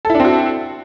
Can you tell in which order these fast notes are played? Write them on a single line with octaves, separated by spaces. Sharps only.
A4 E4 D4 C4 F#4